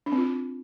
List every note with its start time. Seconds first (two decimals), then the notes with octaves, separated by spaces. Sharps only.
0.06 D4
0.12 C4
0.18 F4